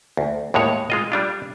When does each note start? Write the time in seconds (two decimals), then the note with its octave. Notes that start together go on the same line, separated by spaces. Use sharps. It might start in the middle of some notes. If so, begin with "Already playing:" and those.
0.17 D2
0.54 D#2 A2 G#3 C#5
0.90 G#3 F4 D#5
1.12 G3 D4 F4